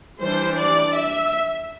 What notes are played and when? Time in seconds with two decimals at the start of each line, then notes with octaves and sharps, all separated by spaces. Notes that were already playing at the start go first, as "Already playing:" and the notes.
0.20 E3 G3 D4 C5
0.57 D5
0.95 E5